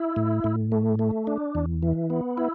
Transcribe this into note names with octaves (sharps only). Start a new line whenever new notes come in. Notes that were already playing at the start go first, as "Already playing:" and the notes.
Already playing: E4
A2
A2
A3
A3
D4
E2
E3
B3
E4